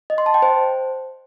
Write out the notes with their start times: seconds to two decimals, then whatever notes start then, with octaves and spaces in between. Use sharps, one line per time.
0.10 D#5
0.18 C6
0.26 A5
0.34 G5
0.42 C5